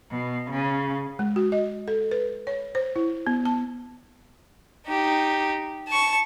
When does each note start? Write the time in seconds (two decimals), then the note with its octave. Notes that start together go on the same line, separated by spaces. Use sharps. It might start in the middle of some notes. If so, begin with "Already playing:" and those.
0.10 B2
0.50 C#3
1.19 G#3
1.36 F#4
1.52 D#5
1.88 A4
2.11 B4
2.47 C#5
2.75 C5
2.96 E4
3.27 B3
3.45 A5
4.86 D#4 G4
5.88 A5 C#6